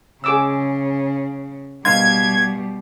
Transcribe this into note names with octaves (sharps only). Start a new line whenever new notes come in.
C#3 G#4 D6 E6
B2 G3 D#4 F5 C6 G#6